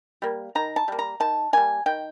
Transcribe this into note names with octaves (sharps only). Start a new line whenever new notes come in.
G3 A#3
D#3 A#5
A5
G3 A#3
A#5
D#3 A5
G3 A#3 G#5
D#3 G5